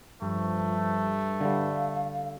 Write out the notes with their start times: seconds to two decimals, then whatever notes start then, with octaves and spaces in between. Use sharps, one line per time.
0.22 G2 F3 A3
1.41 D3 G3 F5